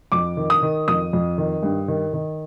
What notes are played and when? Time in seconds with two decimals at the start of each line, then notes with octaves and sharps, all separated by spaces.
0.12 F2 D6
0.37 D#3
0.50 D#6
0.62 D#3
0.88 F2 D#6
1.13 F2
1.38 D#3
1.63 G2
1.88 D#3
2.13 D#3